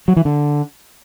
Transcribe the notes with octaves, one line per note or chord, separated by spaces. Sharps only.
F#3
E3
D3